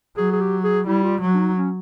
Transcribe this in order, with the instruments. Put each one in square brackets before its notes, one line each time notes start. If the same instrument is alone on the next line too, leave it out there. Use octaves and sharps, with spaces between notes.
[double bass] F#3 [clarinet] G#4
[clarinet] G#4
G4
G#4
[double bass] G3 [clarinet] E4
[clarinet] F4
[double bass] F#3
[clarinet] D4
D#4
C#4